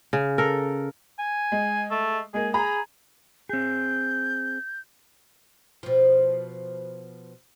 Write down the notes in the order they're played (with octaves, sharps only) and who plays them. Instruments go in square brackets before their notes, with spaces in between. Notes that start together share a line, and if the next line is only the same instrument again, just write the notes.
[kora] C#3
A4 A#4
[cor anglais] G#5
[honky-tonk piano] G#3
[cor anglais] A3
[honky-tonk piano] G#3 A#3 [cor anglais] G#4
[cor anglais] G#4 [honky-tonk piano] A#5 B5
[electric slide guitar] C4 G#4 [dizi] G6
[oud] B2 F3